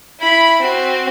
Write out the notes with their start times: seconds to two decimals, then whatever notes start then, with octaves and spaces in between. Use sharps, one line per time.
0.20 E4 B5
0.61 C4 F#4